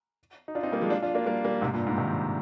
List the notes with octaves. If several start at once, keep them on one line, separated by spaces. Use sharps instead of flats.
D#4
D4 F4
C4 D#4
G3 A#3
F3 G#3
D4 F4
D4 F4
A#3 D4
G3 A#3
G3 A#3
G#2 C3
G2 A#2
G#2
C3 D#3